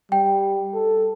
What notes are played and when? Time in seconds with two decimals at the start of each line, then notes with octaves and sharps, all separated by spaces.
0.12 G3 G5
0.75 A4